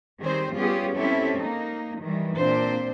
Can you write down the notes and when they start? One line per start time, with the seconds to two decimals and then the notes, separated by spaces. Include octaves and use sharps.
0.21 D#3 G3 C4 G4 G#4 C5
0.55 G3 B3 C#4 F4 G4 G#4
0.96 C4 C#4 E4 G4 A4
1.38 A#3 D#4
2.02 D#3 E3 G3
2.36 A#2 C4 D4 C5